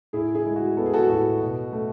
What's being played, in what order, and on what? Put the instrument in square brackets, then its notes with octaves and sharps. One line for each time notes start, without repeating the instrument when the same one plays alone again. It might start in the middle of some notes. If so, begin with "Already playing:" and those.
[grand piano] A2 E4 G#4
E4 G#4
G#3
F#4
B3 A4
G#4
F#4 A4
A2 F#4
B2
A3